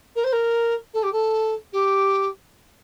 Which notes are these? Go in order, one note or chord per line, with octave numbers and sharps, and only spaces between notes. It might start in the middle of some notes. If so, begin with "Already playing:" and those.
A#4
C5
A#4
A4
G4
A4
G4